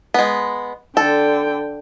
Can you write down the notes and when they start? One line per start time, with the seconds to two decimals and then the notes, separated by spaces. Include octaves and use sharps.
0.14 G#3 B3
0.97 D3 A4 G5